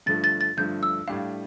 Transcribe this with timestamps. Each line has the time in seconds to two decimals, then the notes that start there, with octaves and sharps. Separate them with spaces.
0.06 G2 D3 F3 A3 A6
0.24 A6
0.41 A6
0.57 G2 D3 F3 A3 G6
0.83 E6
1.08 A2 G3 D4 F5